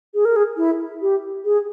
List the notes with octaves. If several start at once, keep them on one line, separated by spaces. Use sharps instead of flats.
G#4
A#4
G#4
E4
G4
G#4